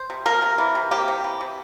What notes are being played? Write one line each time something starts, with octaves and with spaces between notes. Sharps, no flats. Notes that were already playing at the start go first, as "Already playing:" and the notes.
Already playing: C5
C3
A#3 A#4
C3
E3
C3
A#3 G4
C3
E3
C3